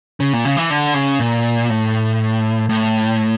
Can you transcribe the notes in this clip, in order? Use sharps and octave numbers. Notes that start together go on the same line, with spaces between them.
C#3
A#2
C#3
E3
D3
C#3
A#2
A2
A2